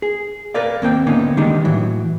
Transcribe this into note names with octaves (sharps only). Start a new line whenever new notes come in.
G#4
A#4 B4 D5 F5
D#2 A#3 C4 G5
D3 A#3 B3 C#4 D#4
D#3 G3 G#3 A#3 D4 D#4
A2 E3 F#3